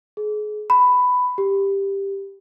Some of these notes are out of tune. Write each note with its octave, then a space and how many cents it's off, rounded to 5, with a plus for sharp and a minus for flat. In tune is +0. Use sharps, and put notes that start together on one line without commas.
G#4 +30
B5 +10
G4 +10